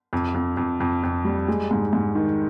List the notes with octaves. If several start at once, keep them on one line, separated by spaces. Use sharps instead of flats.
F2
F2
F2
F2
F2
G3
G#3
G#2
G#2
D#3